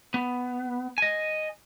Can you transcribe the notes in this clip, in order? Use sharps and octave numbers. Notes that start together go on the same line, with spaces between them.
B3
D#5 G#5